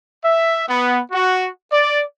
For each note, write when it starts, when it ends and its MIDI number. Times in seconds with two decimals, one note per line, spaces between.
0.23 0.63 76
0.69 0.98 59
1.11 1.48 66
1.70 2.02 74